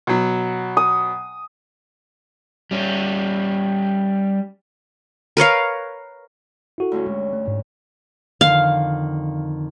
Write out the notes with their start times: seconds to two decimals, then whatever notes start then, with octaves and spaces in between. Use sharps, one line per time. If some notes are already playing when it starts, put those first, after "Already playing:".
0.07 B2 F#3
0.77 D#6
2.71 G3 C#4
5.37 A#4 B4 C#5 F5
6.78 E4 F#4 A4
6.92 D2 G2 C#4
7.06 G#3
7.33 A3
7.48 G#2
8.41 F2 D3 D#3 F5